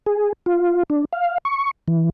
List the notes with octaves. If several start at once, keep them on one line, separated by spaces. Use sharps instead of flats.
G#4
F4
D4
F5
C#6
E3